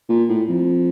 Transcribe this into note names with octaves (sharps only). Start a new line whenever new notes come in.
A#2
A2
F2